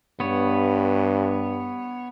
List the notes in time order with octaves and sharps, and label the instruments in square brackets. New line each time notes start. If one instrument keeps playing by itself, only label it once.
[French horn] G2 [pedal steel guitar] B3 C#5